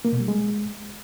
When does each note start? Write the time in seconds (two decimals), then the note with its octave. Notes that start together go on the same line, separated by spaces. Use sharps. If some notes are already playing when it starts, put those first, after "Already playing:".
0.05 A#3
0.12 B2
0.20 G3
0.28 G#3